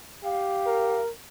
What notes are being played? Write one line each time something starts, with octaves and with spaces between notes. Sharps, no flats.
G4 F5
A#4